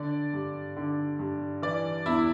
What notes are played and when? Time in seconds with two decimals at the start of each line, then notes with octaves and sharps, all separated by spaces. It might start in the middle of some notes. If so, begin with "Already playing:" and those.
Already playing: D3 D5
0.34 G2
0.76 D3
1.19 G2
1.62 E3 D5
2.06 E2 E4